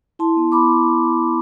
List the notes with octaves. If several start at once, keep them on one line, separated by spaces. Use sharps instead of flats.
E4 A5 C6
B3
B3 B5 D6
B3